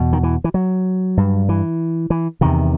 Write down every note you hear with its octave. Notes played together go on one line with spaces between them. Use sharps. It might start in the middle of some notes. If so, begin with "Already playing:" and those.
Already playing: E2 B2
D#3
E3
E3
F#3
G2
E3
E3
E2 C3 D#3